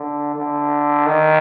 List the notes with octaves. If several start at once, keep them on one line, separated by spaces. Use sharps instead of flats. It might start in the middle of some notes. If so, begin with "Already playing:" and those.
Already playing: D3
D3
D#3